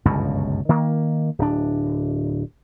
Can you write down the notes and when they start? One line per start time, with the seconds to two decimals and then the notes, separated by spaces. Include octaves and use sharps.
0.05 G1 C#2 F#2 B2
0.69 D#3 A#3
1.39 D1 D4